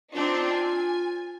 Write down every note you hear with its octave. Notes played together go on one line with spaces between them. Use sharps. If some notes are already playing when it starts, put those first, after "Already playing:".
C4 D4 D#4 F4
G#5